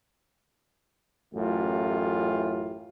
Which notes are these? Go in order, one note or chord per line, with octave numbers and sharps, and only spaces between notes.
A1 F#2 A3 E4 F4 G4